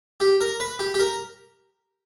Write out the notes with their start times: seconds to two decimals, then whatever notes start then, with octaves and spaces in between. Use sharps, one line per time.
0.20 G4
0.41 A#4
0.60 B4
0.79 G4
0.94 G4
0.99 A#4